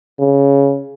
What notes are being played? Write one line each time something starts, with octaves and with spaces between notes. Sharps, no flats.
C#3